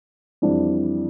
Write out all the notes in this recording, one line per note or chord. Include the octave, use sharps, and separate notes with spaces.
F2 E3 G3 D4